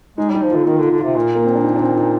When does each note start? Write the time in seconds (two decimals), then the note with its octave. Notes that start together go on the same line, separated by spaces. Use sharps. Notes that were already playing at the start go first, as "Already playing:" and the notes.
0.18 G#3 D#4
0.30 G3 D#4
0.42 F3
0.51 D3 F4
0.66 D#3 D#4
0.78 D3
0.83 F4
0.91 D3
0.99 C3 F4
1.16 A#2
1.35 A#3
1.45 C4
1.55 D4
1.64 D#4
1.76 D4
1.82 C4
1.97 D#4